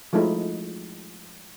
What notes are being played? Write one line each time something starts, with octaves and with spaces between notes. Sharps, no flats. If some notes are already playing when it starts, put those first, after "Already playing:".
F3 G#3 A3 D#4 E4